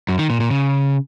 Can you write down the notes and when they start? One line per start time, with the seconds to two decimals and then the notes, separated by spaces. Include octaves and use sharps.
0.09 F#2
0.19 D#3
0.30 A#2
0.40 A#2
0.51 C#3